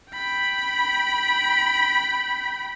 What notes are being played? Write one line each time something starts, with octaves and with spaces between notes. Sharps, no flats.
G5 B5